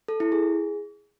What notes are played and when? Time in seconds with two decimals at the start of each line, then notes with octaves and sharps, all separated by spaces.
0.08 A4
0.20 E4
0.32 G#4